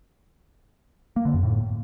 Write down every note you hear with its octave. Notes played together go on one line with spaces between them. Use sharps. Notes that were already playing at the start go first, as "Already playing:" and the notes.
A#3
D3
F#2
A2